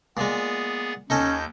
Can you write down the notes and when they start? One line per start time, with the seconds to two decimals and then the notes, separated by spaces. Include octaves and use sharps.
0.17 A#2 G#3 B3 G#4 A6
1.10 D#2 C#4 D#4 A4 D#5 G6